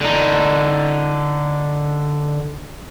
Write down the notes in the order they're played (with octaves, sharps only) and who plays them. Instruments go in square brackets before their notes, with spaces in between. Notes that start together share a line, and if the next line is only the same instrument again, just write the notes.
[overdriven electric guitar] D3 D#4